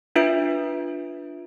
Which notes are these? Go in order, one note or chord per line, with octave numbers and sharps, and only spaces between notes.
D4 F4 B4 E5 G6 D7